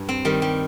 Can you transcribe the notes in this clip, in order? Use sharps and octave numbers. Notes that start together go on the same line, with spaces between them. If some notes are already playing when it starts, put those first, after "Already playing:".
Already playing: G2
C4
D#3 G3
G3